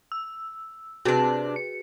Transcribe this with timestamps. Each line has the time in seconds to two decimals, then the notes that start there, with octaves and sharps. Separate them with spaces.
0.12 E6
1.05 C3 D4 F#4 G#4 B4
1.56 C#7